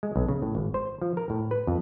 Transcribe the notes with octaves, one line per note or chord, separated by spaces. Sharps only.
G#3
B1
C#3
A2
G#1
C5
F3
A#4
A2
B4
F2